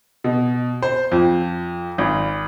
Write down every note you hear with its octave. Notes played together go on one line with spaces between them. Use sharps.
B2
C5
F2
G#1